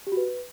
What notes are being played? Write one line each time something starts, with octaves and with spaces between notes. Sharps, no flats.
G4
F#4
B4